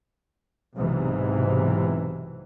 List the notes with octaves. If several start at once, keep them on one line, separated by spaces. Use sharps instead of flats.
B1 G#2 C3 E3